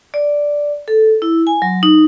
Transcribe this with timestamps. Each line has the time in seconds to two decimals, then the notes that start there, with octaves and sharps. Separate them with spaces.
0.14 D5
0.88 A4
1.22 E4
1.47 G#5
1.62 F#3
1.83 D#4